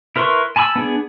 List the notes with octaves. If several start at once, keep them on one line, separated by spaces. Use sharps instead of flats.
E4 A#4 B4 C6 C#6
G#5 A5 B5 C#6 E6
B3 D4 G#4